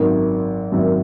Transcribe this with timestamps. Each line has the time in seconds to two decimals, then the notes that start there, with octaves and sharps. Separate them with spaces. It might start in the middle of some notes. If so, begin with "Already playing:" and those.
Already playing: G#1 F#2 D#3
0.72 G#1 F#2 D#3